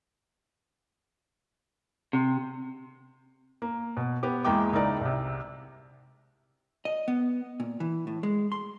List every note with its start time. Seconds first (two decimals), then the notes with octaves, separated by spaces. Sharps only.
2.13 C3
3.62 A#3
3.97 B2
4.23 B3 G4
4.44 E2 G#3 A#3 E4 G5 D6
4.72 C#2 D#4 E4 A#4 D5 A#5
5.01 C2 C3
6.85 D#5
7.08 B3
7.60 A#2
7.80 E3
8.07 A2
8.23 G#3
8.52 C6